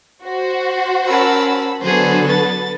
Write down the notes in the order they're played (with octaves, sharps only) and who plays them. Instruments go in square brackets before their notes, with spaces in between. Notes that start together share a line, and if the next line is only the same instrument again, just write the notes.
[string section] F#4 C5
[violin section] C#4 B5 E6 [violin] A#4 A5
[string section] D3 F#3 F#4 [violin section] B3 A4 B4 [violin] G#4 C5
[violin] A6